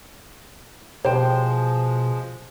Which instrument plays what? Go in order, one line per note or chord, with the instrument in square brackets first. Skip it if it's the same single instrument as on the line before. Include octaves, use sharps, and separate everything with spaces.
[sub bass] B2 [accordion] F3 G#3 [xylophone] G4 G5 [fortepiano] C5